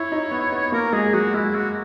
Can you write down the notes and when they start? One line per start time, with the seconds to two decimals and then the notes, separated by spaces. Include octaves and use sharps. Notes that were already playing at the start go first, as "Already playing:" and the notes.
Already playing: E4 C#5
0.12 D#4
0.32 B3
0.52 B3
0.72 A#3 A#4
0.93 G#3 G#4
1.13 F#3 F#4
1.34 G#3 E4
1.54 F#4